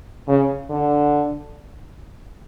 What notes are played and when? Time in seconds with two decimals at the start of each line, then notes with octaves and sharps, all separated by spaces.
0.28 C#3
0.70 D3